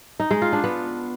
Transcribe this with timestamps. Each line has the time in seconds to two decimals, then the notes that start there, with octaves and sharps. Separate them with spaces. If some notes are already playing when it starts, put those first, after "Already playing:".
0.20 D#4
0.31 G#3
0.42 F4
0.53 D4
0.64 B3